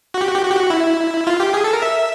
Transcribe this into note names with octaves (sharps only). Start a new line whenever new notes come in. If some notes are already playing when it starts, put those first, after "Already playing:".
F#4
G4
F#4
G4
F#4
G4
F#4
E4
F4
G4
G#4
A4
A#4
E5